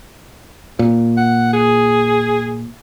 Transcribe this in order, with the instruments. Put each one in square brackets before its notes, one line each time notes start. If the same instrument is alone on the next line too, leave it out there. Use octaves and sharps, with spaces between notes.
[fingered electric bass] A#2
[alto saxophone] F#5
G#4